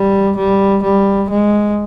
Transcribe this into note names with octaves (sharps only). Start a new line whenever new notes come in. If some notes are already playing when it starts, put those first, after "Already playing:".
Already playing: G3
G3
G3
G#3